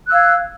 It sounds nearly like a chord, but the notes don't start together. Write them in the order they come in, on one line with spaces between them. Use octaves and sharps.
F#6 E6 F5 G#6